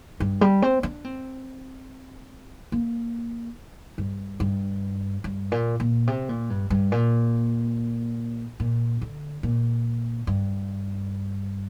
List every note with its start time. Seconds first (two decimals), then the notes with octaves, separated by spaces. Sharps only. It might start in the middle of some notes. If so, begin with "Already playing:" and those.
0.20 G2
0.41 G3
0.62 C4
0.83 D4
1.05 C4
2.72 A#3
3.98 G2
4.40 G2
5.24 G2
5.52 A#2
5.80 A#2
6.07 C3
6.29 A#2
6.50 G2
6.70 G2
6.92 A#2
8.60 A#2
9.01 D3
9.43 A#2
10.27 G2